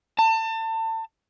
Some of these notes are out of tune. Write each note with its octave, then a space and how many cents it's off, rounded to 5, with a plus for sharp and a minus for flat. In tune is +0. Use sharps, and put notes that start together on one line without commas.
A5 +30